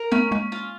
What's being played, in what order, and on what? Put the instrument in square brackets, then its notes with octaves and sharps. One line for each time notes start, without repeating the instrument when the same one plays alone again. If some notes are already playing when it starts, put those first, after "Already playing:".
Already playing: [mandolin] A#4
[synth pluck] A3 B3 [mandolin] C#4
[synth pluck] G#3 A#3 [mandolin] C#4
[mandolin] F4